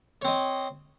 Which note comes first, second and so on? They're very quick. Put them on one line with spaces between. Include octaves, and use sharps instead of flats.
C#5 C4 D#5